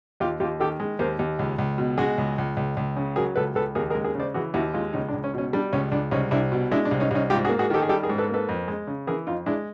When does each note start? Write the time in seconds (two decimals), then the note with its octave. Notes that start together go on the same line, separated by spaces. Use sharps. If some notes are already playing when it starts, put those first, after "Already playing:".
0.20 D#2 F4 G4
0.40 D#2 F4 G4
0.60 D#3 G4 A4
0.80 G#3
0.99 D#2 A#4 C5
1.19 D#2
1.39 C#2
1.58 C#2
1.78 B2
1.98 G#3 F#4 G#4
2.18 C#2
2.38 C#2
2.57 C#2
2.77 C#2
2.97 C#3
3.16 F#3 G#4 A#4
3.36 C#2 A4 B4
3.55 C#2 A4 B4
3.75 D#2 G#4 A#4
3.90 G#4 A#4
3.95 G#3
4.05 G#4 A#4
4.15 C#3 C5 D5
4.34 E3 F#4 G#4
4.54 D#2 E4 F#4
4.74 G#3 D#4 F4
4.93 C#2 C#4 D#4
5.09 D4
5.13 C#2
5.24 C#4
5.34 B2 C#4
5.53 G3 D4
5.73 C#2 C#4
5.92 C#2 D4
6.11 C2 C#4 D#4
6.31 C2 D4 E4
6.52 B2
6.71 G#3 D4 E4
6.85 D4
6.91 C2
7.00 C#4 D#4
7.11 C2 C#4 D#4
7.30 G#2 F4 G4
7.45 F#4 G#4
7.49 A#3
7.59 F#4 G#4
7.70 D#3 G4 A4
7.82 G#4
7.89 G3 G4 A4
8.03 G#4 A#4
8.09 G#2
8.18 A4 B4
8.29 A#3 A4 B4
8.49 F2
8.68 G#3
8.87 C#3
9.07 E3 G#4 A#4
9.27 F2 D#4 F4
9.46 G#3 D4 E4